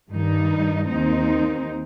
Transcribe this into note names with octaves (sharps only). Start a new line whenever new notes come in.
G2 D#3 G3 D#4
D#2 D#3 C4 D#4